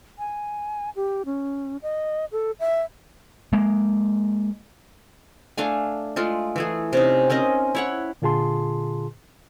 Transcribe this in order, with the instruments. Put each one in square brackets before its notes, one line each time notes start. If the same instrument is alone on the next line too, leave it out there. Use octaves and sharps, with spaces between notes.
[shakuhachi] G#5
G4
C#4
D#5
A4
E5
[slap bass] G#3 A#3
[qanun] A3 D4 F5 G#5
G#3 A3 F4
E3 A3 G#4
C3 C#4 D#4
C4 C#4 A#4 D#5
E4 C#5 F#5
[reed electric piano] A#2 D3 F4 G#4 A5 C6